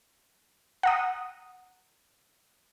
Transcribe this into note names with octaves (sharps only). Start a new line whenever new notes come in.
F#5 A#5 D#6